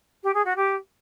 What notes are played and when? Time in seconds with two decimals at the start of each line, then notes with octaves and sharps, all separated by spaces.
0.23 G4
0.34 G#4
0.45 F#4
0.56 G4